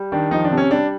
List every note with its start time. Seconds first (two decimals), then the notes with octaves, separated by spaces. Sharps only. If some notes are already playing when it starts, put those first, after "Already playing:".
Already playing: G3
0.12 D#3 D4
0.31 F3 D#4
0.44 D4
0.51 C3
0.57 C#4
0.71 G3 D4